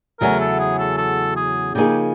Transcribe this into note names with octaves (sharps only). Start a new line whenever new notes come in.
E2 C#3 F#3 A3 C#4 A#4
A4
G#4
A4
A4
G#4
C#3 F3 A#3 D#4 G4 G#4